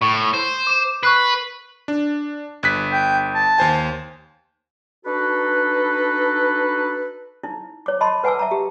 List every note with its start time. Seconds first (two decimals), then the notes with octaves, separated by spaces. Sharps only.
0.02 A2 C#6
0.34 C5
0.67 D6 E7
1.03 B4 C#6 F#6 C7
1.88 D4
2.63 G1 F#6 B6
2.92 G5
3.35 A5
3.58 D#2 C5 G#5
5.06 D4 D#4 F#4 A4 B4
7.43 D#4 E4
7.86 C#5 D6
8.01 D#5 A5 B5 C6
8.24 B4 F#5 G#5 A5 D6 E6
8.39 E5 A5 A#5
8.51 G4